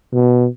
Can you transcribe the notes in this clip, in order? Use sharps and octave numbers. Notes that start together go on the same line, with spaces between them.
B2